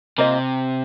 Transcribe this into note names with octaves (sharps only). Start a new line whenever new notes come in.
C3 A#3 F4 C5 D#5